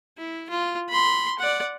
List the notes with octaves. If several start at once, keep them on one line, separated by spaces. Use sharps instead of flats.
E4
F4
B5 C6
D5 F#5